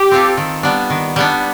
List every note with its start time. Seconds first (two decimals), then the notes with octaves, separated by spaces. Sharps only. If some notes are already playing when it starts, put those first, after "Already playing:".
Already playing: G4
0.11 C4 F4 A4
0.37 D#3
0.63 G3 B3 D4
0.90 D#3
1.16 G3 B3 D4